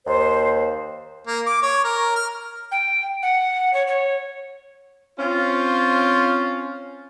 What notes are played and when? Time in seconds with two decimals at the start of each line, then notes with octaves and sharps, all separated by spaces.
0.06 D#2 C5
1.27 A#3
1.46 D6
1.62 C#5
1.84 A#4
2.16 F6
2.72 G5
3.23 F#5
3.74 C#5
3.87 C#5
5.19 C4 C#4 F4